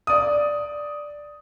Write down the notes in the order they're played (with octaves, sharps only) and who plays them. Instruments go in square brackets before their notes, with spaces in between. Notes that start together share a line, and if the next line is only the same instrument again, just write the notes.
[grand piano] D5 D#6